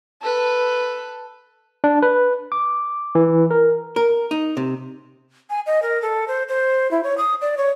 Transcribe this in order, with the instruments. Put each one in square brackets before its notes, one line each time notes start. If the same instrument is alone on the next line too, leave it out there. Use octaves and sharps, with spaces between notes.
[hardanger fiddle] A4 B4
[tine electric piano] D4
B4
D6
E3
A#4
[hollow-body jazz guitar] A#4
D#4
C3
[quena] G#5
D#5
A#4
A4
C5
C5
E4
C#5
D#6
D5
C#5